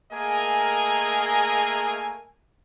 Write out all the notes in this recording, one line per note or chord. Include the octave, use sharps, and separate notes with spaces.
A3 A#3 G#4 A#4 D#5 G#5